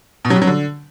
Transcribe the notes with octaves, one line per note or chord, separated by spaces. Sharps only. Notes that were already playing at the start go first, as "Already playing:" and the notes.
B2
F#3
G3
F#3
D3